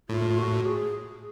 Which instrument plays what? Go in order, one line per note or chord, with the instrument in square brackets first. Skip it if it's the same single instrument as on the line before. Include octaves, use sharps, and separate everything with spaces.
[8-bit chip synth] A2 [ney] F4
[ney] F#4
G#4